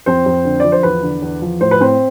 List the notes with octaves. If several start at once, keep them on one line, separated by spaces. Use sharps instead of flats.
F2 C4 C5
F2
D3
F3 D5
C5
E2 B4
D3
E2
F3
A2 C5
B4
A2 C4 C5